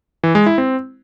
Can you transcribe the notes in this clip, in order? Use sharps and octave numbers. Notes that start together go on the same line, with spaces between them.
E3
G#3
E4
C4